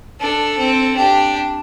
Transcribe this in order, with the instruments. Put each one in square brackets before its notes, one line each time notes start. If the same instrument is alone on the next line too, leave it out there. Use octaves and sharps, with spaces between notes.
[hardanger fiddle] D4 [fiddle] A4
[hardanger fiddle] C4
[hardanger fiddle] D4 [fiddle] G4